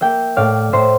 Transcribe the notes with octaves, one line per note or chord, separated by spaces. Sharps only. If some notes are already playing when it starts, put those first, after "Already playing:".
A#3 E5 G5
A2 D5 F5
A2 C5 E5